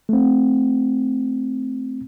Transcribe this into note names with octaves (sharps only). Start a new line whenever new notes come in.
A3 C4